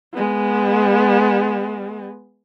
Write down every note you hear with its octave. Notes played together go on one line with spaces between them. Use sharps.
G#3 B3